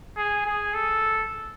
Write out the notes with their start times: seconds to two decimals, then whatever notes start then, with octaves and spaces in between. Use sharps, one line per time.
0.17 G#4
0.45 G#4
0.74 A4